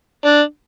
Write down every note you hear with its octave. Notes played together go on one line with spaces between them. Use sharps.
D4